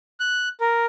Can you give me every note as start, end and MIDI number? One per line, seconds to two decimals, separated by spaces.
0.20 0.49 90
0.60 0.86 70